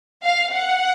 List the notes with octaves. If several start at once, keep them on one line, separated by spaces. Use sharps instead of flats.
F5
F#5